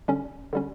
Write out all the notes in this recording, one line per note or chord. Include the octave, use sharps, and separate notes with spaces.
D3 G3 C#4
D3 G3 C#4